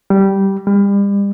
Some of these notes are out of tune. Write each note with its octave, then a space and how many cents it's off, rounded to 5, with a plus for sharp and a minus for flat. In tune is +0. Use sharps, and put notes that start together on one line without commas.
G3 -10
G3 +35